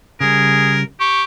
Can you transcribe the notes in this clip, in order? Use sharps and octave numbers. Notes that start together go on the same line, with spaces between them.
C#3 G3 G#4 A#4
G4 C#6